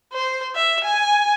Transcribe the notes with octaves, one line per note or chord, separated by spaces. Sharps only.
C5
E5
G#5